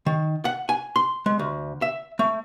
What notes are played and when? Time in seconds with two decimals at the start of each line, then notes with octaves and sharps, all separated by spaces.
0.06 D#3
0.45 F#5
0.69 G#5
0.96 C6
1.26 G#3
1.39 D2
1.82 E5
2.19 A3